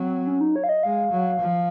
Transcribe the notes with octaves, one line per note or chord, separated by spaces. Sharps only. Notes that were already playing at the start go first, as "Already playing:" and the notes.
Already playing: F#3 C4
C#4
D#4
C#5
F5
D#5
G#3 F5
F#3
F3